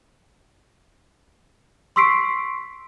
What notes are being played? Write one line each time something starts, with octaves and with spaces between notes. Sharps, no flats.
C6 C#6 E6 B6 C7 D7